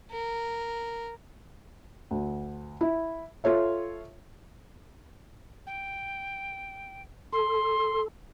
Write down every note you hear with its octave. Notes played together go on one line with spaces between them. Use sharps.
A#4
D2
E4
F4 A4 C#5 E5
G5
A4 C6